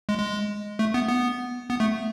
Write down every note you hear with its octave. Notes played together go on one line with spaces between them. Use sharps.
G#3
G#3
A3
B3
B3
B3
A3